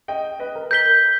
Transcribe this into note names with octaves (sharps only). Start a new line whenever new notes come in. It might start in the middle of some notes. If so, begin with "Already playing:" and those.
D#5 G5
B4 D#5
A#4
A#4 G6 B6 G7